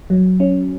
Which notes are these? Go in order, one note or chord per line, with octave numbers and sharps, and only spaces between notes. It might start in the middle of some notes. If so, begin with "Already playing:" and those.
F#3
C#4